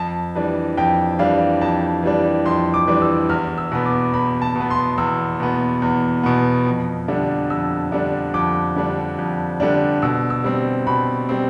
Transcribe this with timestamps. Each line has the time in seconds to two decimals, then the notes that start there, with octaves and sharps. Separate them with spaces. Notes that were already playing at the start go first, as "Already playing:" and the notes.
Already playing: F2 A5
0.35 E3 G3 D4
0.77 F2 G5
1.19 E3 G3 D4 F5
1.61 F2 A5
2.03 E3 G3 D4
2.45 F2 C6
2.74 D6
2.87 E3 G3 D4
3.02 E6
3.29 E2 F6
3.58 E6
3.71 B2 B3
3.86 D6
4.13 E2 B5
4.42 A5
4.56 B2 B3
4.70 C6
4.98 E2 E6
5.40 B2 B3
5.82 E2
6.23 B2 B3
6.66 F2
7.08 D3 G3 D4
7.50 F2 E6
7.92 D3 G3 D4
8.34 F2 D6
8.76 D3 G3 D4
9.19 F2
9.60 D3 G3 D4
10.02 B2 E6
10.30 E6
10.44 G3 C4
10.87 B2 B5
11.29 G3 C4